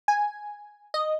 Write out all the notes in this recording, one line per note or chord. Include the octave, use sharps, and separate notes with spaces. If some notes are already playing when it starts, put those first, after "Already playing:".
G#5
D#5